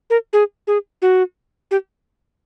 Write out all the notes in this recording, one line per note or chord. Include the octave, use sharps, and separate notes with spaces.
A#4
G#4
G#4
F#4
G4